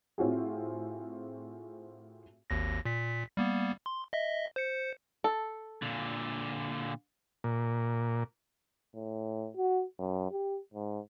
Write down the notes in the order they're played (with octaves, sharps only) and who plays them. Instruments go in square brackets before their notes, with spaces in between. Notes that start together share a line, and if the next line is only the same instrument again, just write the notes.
[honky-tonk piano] A2 C4 F4 F#4 G#4
[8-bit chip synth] G#1 D#2 A#6
A#2 B6
G3 A#3 B3
C6
D#5 E5
C5 C#7
[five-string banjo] A4
[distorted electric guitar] A#2 D3
[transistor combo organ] A#2
[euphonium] A2
F#4
F#2
G4
G#2